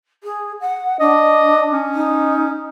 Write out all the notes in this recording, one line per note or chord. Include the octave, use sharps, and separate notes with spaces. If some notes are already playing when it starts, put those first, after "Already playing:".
G#4
F#5
D4 D#5
C#4
D#4